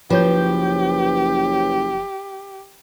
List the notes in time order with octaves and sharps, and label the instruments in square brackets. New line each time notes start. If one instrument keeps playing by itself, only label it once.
[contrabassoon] F#1 [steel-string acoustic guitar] F3 [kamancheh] G4 [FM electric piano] B4 C#5 G6